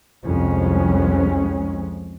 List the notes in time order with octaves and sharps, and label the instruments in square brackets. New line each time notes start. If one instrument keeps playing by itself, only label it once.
[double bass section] C2 F2 G#3 C#4